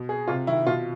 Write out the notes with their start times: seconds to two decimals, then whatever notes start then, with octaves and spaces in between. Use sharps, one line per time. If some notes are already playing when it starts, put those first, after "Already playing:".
Already playing: B2
0.09 G#4
0.28 C3 F4
0.47 D#3 E4
0.67 B2 F4